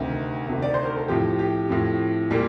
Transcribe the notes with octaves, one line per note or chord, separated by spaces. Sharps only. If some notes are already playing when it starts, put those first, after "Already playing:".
Already playing: D2 C3 D#3
D2 C3 D#3
D5
C5
A#4
A4
A2 F3 C4 G4
G4
A2 F3 C4
A#2 G3 A#3